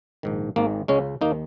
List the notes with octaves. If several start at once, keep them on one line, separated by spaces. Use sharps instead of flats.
A#1 G#2 D#3
G#1 G#2 D#3 A#3
C#2 C#3 G#3 C#4
D#2 D#3 A#3 D#4